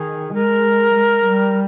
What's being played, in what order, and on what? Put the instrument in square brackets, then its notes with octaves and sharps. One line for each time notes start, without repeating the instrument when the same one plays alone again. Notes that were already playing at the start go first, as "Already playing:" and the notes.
Already playing: [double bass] D#3 [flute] G#4
[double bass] G#3 [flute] A#4
[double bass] G#3
G3